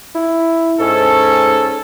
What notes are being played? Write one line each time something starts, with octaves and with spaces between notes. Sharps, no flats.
E4
G#2 C#4 A4